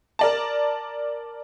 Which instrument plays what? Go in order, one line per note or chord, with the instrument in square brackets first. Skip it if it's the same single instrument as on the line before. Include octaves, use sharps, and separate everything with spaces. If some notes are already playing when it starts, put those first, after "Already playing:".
[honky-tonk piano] A#4 D5 A5